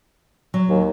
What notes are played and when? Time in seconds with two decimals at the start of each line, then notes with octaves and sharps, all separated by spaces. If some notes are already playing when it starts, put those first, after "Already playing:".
0.54 F#3
0.69 D#2